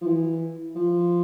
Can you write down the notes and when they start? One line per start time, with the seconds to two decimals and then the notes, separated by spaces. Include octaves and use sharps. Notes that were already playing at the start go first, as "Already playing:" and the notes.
0.02 F3
0.07 E3
0.75 F3